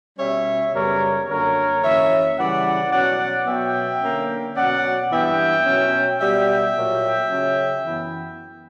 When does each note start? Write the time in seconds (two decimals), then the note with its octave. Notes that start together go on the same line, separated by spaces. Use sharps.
0.19 B2 G3 C#4 C#5 E5
0.73 F#2 C#3 G3 B3 A#4 C#5
1.29 F#2 D3 A#3 C#4 A#4 C#5
1.83 F#2 E3 A#3 C#4 C#5 E5
2.37 C#3 E3 G3 C#4 D5 F#5
2.92 B2 F#3 C#4 D5 F#5
3.47 B2 F#3 B3 E5 G5
4.02 D3 A#3 C#4
4.56 B2 F#3 C#4 D5 F#5
5.12 G2 E3 B3 E5 G5
5.66 B2 F#3 C#4
6.20 B2 G3 B3 E5 G5
6.75 A#2 F#3 A#3
7.30 C#3 F#3 C#4
7.85 F#2 E3 B3